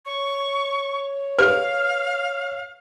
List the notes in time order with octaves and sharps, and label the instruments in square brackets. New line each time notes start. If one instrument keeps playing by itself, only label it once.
[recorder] C#5 [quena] C#6
[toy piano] G#4 B4 [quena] F5 [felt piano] F6